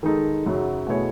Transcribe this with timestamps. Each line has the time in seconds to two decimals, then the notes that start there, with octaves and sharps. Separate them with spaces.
0.03 D#3 G#3 D#4 A4
0.45 F#2 C#3 F#3
0.87 B2 A3 E4 G#4 C#5